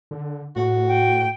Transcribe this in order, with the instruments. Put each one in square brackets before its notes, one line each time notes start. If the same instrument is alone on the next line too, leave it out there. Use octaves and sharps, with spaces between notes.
[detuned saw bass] D3
[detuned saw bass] A2 [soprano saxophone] F#4
[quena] G5